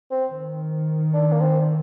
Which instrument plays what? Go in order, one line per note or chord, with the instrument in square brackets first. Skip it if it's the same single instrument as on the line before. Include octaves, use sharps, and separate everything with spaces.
[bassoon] C4
[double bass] D#3
[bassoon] D4
A#3
C4